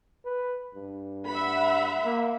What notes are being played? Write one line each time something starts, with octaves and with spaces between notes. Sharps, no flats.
B4
G2
E5 F#5 B5
A#3